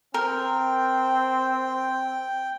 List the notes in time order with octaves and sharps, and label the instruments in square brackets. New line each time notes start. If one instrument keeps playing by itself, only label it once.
[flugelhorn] C4 [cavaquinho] A#4 [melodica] G5